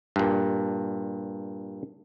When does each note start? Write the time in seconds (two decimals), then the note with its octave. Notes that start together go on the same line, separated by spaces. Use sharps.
0.16 G2 A#2